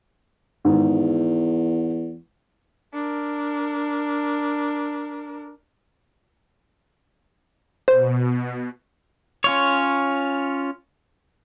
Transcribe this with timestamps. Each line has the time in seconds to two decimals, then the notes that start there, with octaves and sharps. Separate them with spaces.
0.65 E2 G#2 D#3
2.93 D4 A#4
7.88 B2 C5
9.44 C#4 F4 C#5